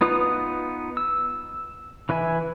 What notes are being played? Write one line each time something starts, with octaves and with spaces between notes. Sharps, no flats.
B3 D#4 F4 B4 D#6
E6
E3 B4 E5 G#5